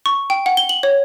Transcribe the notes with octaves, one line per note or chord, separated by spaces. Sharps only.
C#6
G5
F#5
G7
F#7
C#5